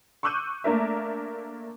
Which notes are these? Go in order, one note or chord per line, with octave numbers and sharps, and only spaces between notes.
C#6 D6 E6 F#6 G6 D#7
A3 A#3 D4 A#4 E5